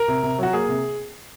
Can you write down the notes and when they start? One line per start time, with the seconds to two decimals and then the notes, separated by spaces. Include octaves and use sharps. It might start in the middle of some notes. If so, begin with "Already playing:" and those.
Already playing: A#4
0.08 C3
0.23 C3
0.38 F#3 F#4
0.53 A#3 G#4
0.69 C3